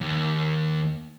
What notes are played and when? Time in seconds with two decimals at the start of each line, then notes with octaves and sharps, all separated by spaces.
0.01 D#2